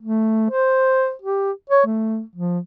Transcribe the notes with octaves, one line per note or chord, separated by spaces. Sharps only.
A3
C5
G4
C#5
A3
F3